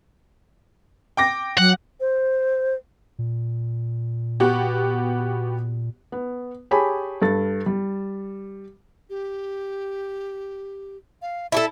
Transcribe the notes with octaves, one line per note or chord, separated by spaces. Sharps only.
G5 D6 A#6
F#3 F#5
C5
A#2
B3 F#4 G4
B3
G4 G#4 C#5 G#5 A5 B5
G2 A4 A6
G3
G4
F5
E4 F#4 A4 A5